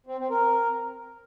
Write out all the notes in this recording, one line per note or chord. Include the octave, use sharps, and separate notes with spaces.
C4
C4
A#4